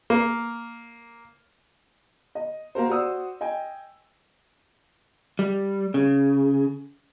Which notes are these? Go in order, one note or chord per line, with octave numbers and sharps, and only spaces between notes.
A#3
D#5
A#3 F#4 A#4 C5
F#4 C5 D5 D#6 E6
D#5 G5 G#5
G3
C#3